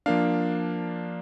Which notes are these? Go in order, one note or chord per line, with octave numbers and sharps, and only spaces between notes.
F3 A#3 D4 F5